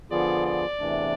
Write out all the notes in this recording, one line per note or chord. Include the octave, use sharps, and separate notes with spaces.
D3 F3 B3 F4 G#4 D5
D5
E2 C3 E3 A3 D4